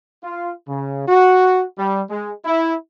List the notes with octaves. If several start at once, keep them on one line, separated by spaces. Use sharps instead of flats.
F4
C#3
F#4
G3
G#3
E4